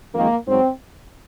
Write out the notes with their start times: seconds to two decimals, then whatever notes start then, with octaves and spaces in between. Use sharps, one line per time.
0.14 F2 D#3 G#3 A#3
0.46 G#2 F#3 C4